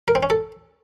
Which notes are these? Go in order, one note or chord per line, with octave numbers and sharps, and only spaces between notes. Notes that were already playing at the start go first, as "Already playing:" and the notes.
A#4
C4
C#4
A4